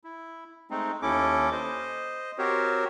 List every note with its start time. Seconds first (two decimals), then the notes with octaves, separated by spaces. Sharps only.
0.04 E4
0.70 G#3 A3 C4 D#4
1.02 D#2 C#4 E4 A4 D6
1.52 C5 D#5
2.38 C4 F#4 G4 A#4 C5 C#5